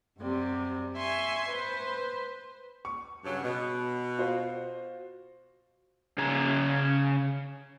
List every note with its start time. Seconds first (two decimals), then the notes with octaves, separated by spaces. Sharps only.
0.20 F#2 C3 G3
0.97 E5 G#5 C6 C#6
1.50 B4 C5
2.85 C#6
3.24 G2 C#3 F#3
3.44 B2
4.18 F4 F#4 C5
6.18 C#3 G#4 A#5